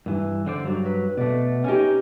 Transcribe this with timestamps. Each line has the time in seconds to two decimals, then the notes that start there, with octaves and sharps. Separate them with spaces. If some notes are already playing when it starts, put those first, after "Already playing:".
0.06 G2 E3
0.46 D3 C5 D5
0.64 G2 F#3
0.86 B4
1.17 B2 A3 D5
1.64 C#4 D#4 G4 G#5